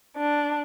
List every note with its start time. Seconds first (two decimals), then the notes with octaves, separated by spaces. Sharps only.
0.17 D4